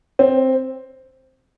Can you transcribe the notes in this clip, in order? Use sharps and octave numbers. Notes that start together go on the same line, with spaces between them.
C4